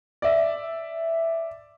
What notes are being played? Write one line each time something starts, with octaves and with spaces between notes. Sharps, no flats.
D5 E5